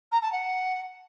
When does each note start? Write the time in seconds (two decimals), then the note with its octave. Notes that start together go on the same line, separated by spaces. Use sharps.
0.12 A#5
0.22 A5
0.32 F#5